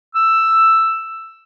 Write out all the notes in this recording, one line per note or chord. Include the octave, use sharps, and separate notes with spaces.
E6